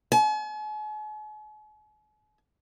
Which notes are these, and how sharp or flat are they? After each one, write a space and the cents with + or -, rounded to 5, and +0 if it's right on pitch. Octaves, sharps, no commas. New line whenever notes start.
G#5 +45